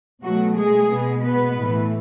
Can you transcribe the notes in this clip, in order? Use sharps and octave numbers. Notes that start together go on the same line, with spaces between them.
B2 F#3 A3 F#4
G#3 G#4
B2 G#3 B3
B3 B4
A2 E3 A3